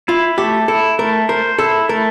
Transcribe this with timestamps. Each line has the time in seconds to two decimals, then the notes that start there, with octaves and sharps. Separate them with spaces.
0.08 E4 F4
0.38 A3 G4
0.68 E4 A4
0.99 A3 A#4
1.29 A#4 C5
1.59 E4 A4
1.89 A3 A#4